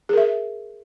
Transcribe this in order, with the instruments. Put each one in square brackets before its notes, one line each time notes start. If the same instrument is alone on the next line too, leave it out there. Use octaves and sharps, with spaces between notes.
[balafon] G#4
A#4
E5